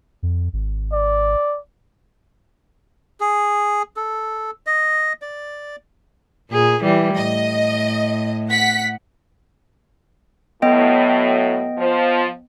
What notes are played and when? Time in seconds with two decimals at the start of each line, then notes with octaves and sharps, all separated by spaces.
0.23 F2
0.53 G#1
0.93 D5
3.20 G#4
3.96 A4
4.66 D#5
5.22 D5
6.50 A#2 G#4
6.82 E3 G3
7.16 A2 D#5
8.50 F#5 B6
10.62 A2 F#3 B3 D#5 G5
11.78 F3